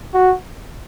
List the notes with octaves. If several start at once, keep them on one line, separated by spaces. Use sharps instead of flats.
F#4